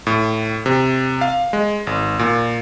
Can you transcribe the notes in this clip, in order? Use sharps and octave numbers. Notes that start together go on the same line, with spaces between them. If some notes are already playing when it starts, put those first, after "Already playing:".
A2
C3
F5
G#3
G#1
A#2